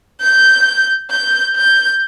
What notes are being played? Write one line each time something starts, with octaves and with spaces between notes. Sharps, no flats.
G6
G6
G6